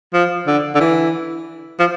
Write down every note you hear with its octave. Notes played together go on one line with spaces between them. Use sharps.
F3
D3
D3
E3
F3